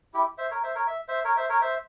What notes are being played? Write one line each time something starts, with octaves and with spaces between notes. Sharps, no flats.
E4 G4
C5 E5
A#4 C#5
C5 E5
A#4 C#5
E5
C5 E5
A#4 C#5
C5 E5
A#4 C#5
C5 E5